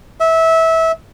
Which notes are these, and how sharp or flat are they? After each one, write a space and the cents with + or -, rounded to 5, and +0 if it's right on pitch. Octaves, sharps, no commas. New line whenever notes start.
E5 -20